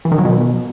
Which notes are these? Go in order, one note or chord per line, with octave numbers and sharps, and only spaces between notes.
E3
D#3
F#3
B2